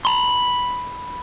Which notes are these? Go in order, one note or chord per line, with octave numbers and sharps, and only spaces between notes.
B5 C6